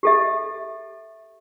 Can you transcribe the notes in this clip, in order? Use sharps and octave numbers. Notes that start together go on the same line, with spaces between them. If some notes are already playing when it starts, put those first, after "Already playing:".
G4 A4 E5